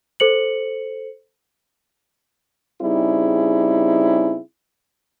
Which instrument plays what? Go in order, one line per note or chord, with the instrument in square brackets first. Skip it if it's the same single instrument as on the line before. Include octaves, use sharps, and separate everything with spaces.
[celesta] A4 C5 C#7 F#7
[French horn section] C#3 G3 C4 D#4 E4 G#4